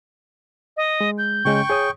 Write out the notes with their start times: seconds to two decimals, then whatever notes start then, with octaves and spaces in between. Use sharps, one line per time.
0.77 D#5
1.01 G#3
1.18 G6
1.45 C#3 G#3 C#4 G5 C#6
1.70 G#4 C#5 D#6